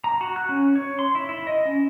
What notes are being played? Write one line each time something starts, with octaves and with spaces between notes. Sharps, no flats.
A#5
F#4
F#6
C#4
C#5
C6
E4
E4
D#5
C#4